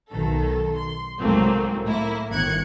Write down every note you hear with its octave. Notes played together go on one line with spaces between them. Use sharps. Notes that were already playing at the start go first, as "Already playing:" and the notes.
B1 D#3 A4
C6
C2 G#2 F#3 A3 A#3 C4
A2 A#3 E4
G1 D#3 F#6 G#6 C#7